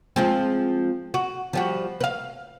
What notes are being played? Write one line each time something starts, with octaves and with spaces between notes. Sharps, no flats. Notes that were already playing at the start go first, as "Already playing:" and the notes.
F3 G#3 C4
F#4
F3 G3 F#4
B4 F5